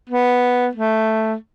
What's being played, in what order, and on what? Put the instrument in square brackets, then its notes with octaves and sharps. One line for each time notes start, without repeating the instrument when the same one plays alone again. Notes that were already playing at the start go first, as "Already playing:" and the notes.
[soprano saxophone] B3
A3